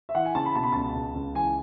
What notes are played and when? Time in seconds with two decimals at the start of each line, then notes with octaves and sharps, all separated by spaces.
0.09 E5
0.15 E3 F#5
0.25 G#5
0.35 C#3 A5
0.46 B5
0.55 B2 A5
0.63 B5
0.72 C#2 A5
0.95 C#2
1.15 C#2
1.35 E3 G#5